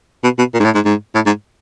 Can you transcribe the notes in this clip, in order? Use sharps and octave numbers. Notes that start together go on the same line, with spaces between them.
B2
B2
A#2
G#2
A2
G#2
G#2
A2
G#2